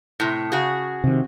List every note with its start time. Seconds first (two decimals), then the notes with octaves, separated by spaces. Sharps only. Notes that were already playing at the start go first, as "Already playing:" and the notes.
0.20 A2 C3
0.52 C#3 F#4 G#4
1.04 C3 D#3